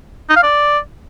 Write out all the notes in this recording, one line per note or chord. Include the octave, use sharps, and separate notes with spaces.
D#4
F5
D5